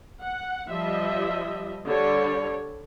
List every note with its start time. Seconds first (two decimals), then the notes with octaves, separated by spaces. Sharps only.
0.22 F#5
0.69 F3 G3 D#5 E5
1.87 D3 G3 A4 C#5 D5